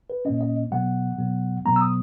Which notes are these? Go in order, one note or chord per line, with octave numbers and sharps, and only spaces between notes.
B4
A#2 A#3 C#4 D#5
D#5
B2 F#3 B3 F#5
B2 F#3 B3
B2 F#3 B3 A#5
E6
D#6